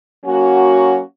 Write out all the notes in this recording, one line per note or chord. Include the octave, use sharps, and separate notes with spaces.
F#3 A#3 C#4 F#4